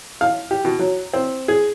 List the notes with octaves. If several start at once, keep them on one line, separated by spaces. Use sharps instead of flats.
F5
G4
B2
F#3
C4
G#4